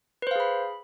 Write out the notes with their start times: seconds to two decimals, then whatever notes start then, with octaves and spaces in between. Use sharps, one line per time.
0.22 B4
0.27 C5
0.31 F5
0.36 G#4
0.40 B5